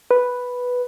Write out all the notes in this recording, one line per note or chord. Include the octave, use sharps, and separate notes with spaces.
B4